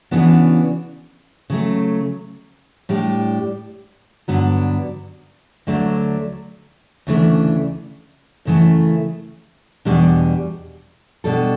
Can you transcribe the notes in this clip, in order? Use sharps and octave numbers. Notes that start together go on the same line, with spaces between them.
C#3 E3 B3 D4 F#4
C#3 F#3 A3
A2 G3 D4 G4
G2 D3 F#3 B3 D4
D2 D3 F#3 A3 D4
D2 C#3 E3 A3 D4
F#2 C#3 E3 A3
E2 B2 G3 D4
B2 G3 D4 A4